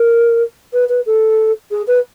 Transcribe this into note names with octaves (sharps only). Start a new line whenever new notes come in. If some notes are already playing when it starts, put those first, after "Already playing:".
Already playing: A#4
B4
B4
A4
G#4
B4